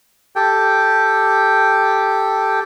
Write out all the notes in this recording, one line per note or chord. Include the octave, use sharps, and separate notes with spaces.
G4 A4 G5